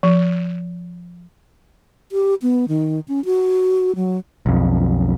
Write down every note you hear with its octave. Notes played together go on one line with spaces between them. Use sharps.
F3
G4
B3
D#3
C#4
F#4
F#3
B1 F2